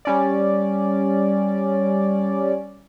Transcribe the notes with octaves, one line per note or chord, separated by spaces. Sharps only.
G3 C#4 D5